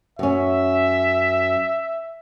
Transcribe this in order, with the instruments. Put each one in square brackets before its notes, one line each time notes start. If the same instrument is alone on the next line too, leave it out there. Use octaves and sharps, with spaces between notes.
[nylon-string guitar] F#2 C#4 [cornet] E5